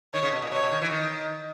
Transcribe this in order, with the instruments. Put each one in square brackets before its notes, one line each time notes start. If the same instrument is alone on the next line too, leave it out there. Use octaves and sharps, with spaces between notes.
[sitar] D#3 [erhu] C#5
[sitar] C#3
B2
A#2
[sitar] B2 [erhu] C#5
[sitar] B2
D#3
E3
D#3